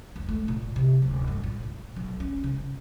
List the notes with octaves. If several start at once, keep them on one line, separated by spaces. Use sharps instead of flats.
E2
A3
A#2
C3
D1
G2
A#2
A2
B1
C#4
C#3